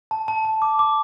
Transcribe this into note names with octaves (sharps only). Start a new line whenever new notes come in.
A5
A5
A5
D6
D6